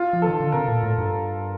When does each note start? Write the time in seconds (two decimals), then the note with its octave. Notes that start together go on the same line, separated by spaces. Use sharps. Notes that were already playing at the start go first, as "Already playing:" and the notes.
Already playing: F4
0.13 F3
0.22 D#3 A4
0.40 D3
0.52 C3 A#4
0.68 A#2
0.83 A2
0.98 G2